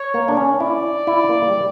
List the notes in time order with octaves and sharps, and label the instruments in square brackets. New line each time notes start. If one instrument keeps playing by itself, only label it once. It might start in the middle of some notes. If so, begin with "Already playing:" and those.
Already playing: [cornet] C#5
[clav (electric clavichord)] A#3
D4
C#4
[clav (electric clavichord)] E4 [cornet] D5
[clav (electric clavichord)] E4
A#3
G3